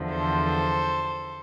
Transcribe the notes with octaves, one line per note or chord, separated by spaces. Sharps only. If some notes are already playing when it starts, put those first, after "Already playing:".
Already playing: E2 D3 F3
A4 C5